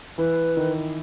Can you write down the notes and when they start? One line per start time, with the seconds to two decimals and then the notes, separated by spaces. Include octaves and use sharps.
0.18 E3 E4 B4
0.57 D#3 D#4